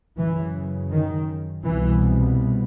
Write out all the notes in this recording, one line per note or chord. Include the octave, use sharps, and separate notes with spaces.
F#2 C#3 E3
D#3
C2 B2 E3